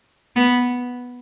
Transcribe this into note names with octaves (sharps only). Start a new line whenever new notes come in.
B3